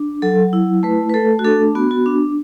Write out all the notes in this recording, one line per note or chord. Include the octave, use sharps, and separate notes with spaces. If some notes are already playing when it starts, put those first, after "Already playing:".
Already playing: D4
F#3 A4
E4
A3 B4
B4
A3 A4
F#4
D4 A4
B3 F#4
F#4
D4